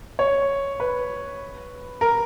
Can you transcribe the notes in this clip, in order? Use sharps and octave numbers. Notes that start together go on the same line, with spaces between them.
C#5
B4
A#4